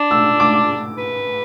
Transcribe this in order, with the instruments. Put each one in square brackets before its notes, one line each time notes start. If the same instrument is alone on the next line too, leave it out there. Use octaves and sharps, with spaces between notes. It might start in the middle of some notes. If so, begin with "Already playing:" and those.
Already playing: [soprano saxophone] D4
[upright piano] E6
D6
[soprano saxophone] B4